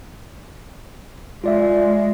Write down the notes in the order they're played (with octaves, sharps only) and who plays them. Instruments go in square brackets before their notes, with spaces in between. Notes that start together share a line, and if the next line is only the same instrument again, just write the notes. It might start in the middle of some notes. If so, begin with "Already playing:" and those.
[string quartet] G#3 [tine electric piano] F4 D5 E5